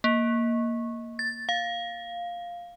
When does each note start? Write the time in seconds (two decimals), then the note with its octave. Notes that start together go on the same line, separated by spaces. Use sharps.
0.04 A#3
1.19 A6
1.49 F5